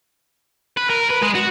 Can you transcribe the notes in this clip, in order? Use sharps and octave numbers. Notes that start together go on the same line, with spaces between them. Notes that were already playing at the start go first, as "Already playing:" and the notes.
B4
A#4
B4
G#3
F#4